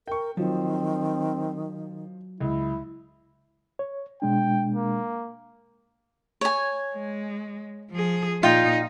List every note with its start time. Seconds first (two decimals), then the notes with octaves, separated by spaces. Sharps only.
0.07 A#4 G5 C#6
0.37 D#3 F3 F#3 C4
2.41 C#2 E4
3.79 C#5
4.22 B2 G#3 D4 G5
4.74 A#3
6.41 C#5 G#5
6.95 G#3
7.92 F3 G#4
8.43 A#2 D#4 F4 F5 G5